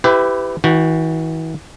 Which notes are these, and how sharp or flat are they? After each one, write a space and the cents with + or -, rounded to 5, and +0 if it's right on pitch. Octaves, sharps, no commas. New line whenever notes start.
E4 +0 G4 +0 B4 +30
E3 -35 F#4 +0 G5 +0